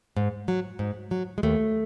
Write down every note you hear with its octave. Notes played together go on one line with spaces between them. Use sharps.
G#2
F#3
G#2
F#3
G#3
D#2 A3